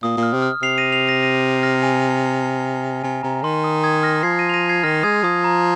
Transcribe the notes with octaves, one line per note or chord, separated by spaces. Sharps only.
A#2 D#6
A#2
F6
C3
F6
C3 C7 F7
A#6 D#7
C7 F7
A#6 D#7
A#6 D#7
F6 A#6
G#5
C3 G#5
C3 A#5
D#3 C6
C6
D#6
D#6 G#6
F6 A#6
F3 G#6 C7
A#6 D#7
F7
A#6 D#7
G#6 C7
D#3 F6 A#6
G#3 D#6 G#6
F3 D#6
A#5